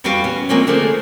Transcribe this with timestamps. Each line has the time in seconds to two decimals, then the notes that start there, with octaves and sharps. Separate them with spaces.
0.04 E2 G3 F#4 B4 F5 G5
0.24 B3 C#4
0.49 F3 G#3 A#3 C4 C#4
0.67 D3 A3 A#3 G#4 C5